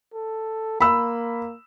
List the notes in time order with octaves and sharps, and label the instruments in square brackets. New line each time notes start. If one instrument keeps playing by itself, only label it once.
[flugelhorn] A4
[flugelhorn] A#3 [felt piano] B5 E6